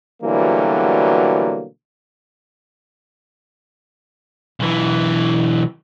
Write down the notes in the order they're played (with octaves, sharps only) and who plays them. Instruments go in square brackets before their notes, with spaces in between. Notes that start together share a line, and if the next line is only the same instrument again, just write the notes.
[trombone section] B2 D3 E3 F#3 G3 A#3
[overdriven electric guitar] B1 E3